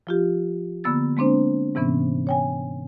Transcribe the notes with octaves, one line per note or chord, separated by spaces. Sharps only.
F3 F4 G4
D3 A#3 B3 E6 A6
G#3 A#3 C4 D4 C5
G#2 C3 E3 B3 C#4
C#5 G5 G#5